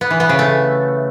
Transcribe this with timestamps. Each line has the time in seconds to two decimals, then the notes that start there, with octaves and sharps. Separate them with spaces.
0.01 B3
0.11 E3
0.20 B3
0.29 C#3
0.39 A3